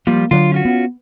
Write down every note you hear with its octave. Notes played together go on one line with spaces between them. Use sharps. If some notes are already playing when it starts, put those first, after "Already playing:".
F3 G3 A#3 F4
D3 F#3 F4
C#4 F4 F#4
B3